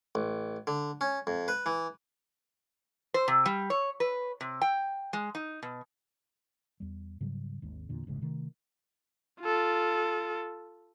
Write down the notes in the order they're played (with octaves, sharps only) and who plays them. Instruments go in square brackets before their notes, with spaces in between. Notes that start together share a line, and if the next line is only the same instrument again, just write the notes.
[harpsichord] A1
D3
C#4
F2
B4
E3
[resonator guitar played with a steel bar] C5
C3
G3
C#5
B4
C3
G5
G#3
D#4
B2
[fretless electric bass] E2 G3
G#2 C#3 F#3 G3
G#1 D#2
E2 A#2 D3
F1 A#1 G#2 C#3
C3 D#3 A3
[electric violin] F4 A4